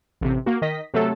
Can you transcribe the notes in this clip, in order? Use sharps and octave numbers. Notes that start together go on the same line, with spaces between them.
A1 C3
A#3 F#4
D#3 D#5 A#6 B6
C3 F#3 A3 A4